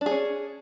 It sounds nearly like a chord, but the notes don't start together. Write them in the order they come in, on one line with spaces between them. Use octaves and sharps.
D4 G#4 C#4